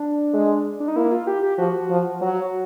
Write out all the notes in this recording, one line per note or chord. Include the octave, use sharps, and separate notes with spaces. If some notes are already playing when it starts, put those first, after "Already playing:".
Already playing: D4
G#3
D4
D#4
A#3 E4
F4
G4
G4
F3 F#4
F3
F#3 F#4